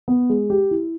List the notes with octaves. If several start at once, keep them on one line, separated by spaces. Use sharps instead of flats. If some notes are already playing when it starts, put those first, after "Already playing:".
B3
G#3
G4
E4